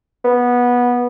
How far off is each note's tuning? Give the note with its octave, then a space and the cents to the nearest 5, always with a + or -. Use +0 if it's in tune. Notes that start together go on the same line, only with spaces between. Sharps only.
B3 -15